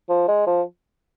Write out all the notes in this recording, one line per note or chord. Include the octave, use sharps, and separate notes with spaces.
F3
G#3
F3